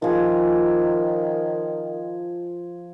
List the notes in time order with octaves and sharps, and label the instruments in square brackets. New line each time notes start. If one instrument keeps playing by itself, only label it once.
[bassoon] D#3 [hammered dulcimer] F3 G#4